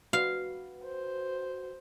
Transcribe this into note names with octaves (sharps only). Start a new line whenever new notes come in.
F#4 B4 F5
C5